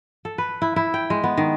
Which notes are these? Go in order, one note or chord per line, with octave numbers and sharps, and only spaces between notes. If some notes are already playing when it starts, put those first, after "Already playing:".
A4
B4
E4
E4
G5
G#3
B3
D#3